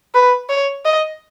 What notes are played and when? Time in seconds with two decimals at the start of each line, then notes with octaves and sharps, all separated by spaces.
0.15 B4
0.49 C#5
0.85 D#5